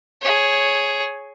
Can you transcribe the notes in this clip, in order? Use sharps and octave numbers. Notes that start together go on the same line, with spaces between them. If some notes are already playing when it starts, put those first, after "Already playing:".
G#4 C#5